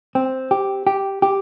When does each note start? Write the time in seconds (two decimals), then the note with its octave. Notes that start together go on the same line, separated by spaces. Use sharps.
0.15 C4
0.51 G4
0.87 G4
1.22 G4